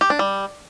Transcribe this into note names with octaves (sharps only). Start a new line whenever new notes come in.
G4
D4
G3